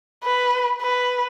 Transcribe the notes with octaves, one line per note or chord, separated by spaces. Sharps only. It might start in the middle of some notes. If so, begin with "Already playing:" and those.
B4
B4